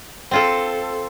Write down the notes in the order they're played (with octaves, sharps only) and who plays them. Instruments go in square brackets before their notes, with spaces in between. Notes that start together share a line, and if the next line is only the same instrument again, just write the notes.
[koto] C4 F4 A4